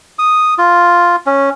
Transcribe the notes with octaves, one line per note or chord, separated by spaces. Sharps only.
D#6
F4
C#4